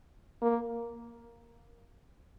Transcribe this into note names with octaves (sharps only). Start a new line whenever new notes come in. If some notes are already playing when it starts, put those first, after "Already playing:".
A#3